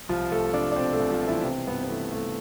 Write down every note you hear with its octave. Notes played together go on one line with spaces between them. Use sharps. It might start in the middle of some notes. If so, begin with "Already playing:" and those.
C2 F3 F4
C2 A3 A4
C2 D4 D5
D5
B2 C4 C5
A3 A4
C2
F3 F4
B2
E3 E4
D4
C3 E3 C4
G2 B3
B3
E3 A3
G2 A3